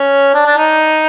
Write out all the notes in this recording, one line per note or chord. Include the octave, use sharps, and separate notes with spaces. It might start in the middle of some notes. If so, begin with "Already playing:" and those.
Already playing: C#4
D4
D4
D#4